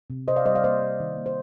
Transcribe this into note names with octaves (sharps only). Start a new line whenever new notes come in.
C3
C3 C5 D#5
D5 F5
G3 C5 D#5
D5 F5
A#3 C5 D#5
C3
D#3
A#3
C5